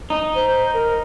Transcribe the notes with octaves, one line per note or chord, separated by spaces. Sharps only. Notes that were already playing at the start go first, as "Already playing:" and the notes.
D#4
C5
A#4